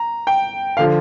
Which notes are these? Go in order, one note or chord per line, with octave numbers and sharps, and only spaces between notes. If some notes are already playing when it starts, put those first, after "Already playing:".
Already playing: A#5
G5
D3 F3 F5